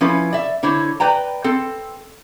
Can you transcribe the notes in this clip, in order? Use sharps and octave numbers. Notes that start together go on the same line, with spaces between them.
F3 C#4 E4 B4
D5 E5
D3 E4 C5 C#5
B4 D5 G5 A#5
C4 A4